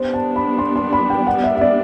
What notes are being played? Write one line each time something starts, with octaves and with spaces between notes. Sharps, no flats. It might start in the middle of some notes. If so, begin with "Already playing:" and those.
Already playing: G3 B3 D4 C5
A5
B5
C6
C6
B5
G5
F#5
E5
E5
D5